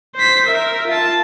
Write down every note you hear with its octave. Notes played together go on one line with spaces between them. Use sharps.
C5 B6
A#4 E5
F4 A5